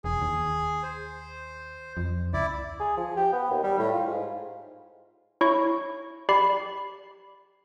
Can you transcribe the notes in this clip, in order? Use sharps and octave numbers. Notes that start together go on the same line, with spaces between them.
E1 G#4
D#2
C5
F2
C#2 E4 D5
G#4
F3
G4
B3
D#2
G3
A2
F4
G#2
E4 C#5 C#6
G4 D5 B5 C7